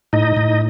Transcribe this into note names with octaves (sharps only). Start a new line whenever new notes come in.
A2 D#4 D#5
A2